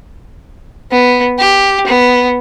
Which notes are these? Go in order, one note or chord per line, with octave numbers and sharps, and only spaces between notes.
B3
G4
B3